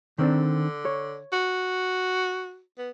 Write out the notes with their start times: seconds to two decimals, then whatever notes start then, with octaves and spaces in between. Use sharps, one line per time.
0.18 D3 D#3 C4 D4
0.85 C#5
1.32 F#4
2.78 B3